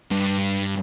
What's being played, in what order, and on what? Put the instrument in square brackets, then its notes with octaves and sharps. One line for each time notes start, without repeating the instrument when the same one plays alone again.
[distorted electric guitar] G2